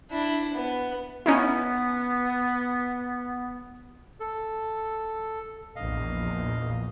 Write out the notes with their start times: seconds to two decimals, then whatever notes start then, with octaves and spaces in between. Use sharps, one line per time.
0.11 D4 E4
0.53 B3
1.26 B3 C#4 D#4 E4
4.20 A4
5.76 A#1 E2 D#5 F5